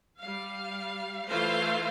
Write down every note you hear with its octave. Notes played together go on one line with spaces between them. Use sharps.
G3 F5
E3 A3 F4 C5 F5